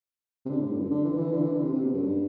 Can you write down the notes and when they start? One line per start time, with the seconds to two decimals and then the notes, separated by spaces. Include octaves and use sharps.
0.45 C3
0.50 D3
0.60 A2
0.70 G2
0.81 F#2
0.91 D3
1.05 E3
1.11 D3
1.18 E3
1.32 D3
1.42 E3
1.53 D3
1.63 C3
1.73 C3
1.83 B2
1.93 F#2
2.03 G2